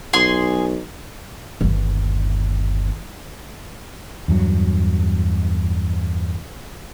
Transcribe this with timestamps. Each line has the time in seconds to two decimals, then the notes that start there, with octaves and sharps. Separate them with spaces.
0.13 B1 G#4 C6
1.61 G1 D#2
4.28 E2 G2 F#3